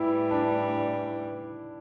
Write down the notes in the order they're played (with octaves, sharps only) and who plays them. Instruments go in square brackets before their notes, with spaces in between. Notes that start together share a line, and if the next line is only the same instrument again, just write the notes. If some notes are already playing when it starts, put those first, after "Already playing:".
Already playing: [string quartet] A2 E3 G3 [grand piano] E4
[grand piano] D4